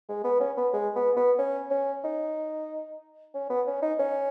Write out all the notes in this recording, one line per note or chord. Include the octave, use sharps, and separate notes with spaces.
G#3
B3
C#4
B3
G#3
B3
B3
C#4
C#4
D#4
C#4
B3
C#4
D#4
C#4